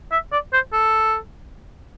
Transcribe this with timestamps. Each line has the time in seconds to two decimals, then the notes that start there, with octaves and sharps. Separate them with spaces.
0.12 E5
0.32 D5
0.53 C5
0.73 A4